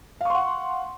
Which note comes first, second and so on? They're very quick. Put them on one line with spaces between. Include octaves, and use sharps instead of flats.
F5 C#6 C6 F#5